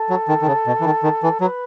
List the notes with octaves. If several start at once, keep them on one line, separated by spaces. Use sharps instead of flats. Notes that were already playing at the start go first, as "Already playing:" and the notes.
Already playing: A4
F#3
D#3
D#3
C#3
B2
E3
D#3
D#3
E3
F#3 B4